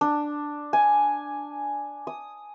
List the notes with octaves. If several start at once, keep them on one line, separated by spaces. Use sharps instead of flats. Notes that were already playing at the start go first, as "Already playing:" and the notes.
D4
G#5
D#6